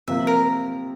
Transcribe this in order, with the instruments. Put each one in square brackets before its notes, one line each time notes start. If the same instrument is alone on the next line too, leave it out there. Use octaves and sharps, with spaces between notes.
[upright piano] C3 F3 A#3 [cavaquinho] E5
[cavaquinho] A#4